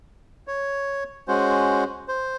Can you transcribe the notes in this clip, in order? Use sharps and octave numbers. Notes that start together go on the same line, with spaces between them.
C#5
G#3 C#4 F#4 C5
C5